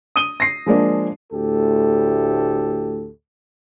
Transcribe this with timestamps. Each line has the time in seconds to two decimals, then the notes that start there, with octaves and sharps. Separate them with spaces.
0.16 D#6 D#7 G7
0.40 A#6 C7
0.66 F3 G#3 A#3 D4
1.32 D2 A2 G4 A4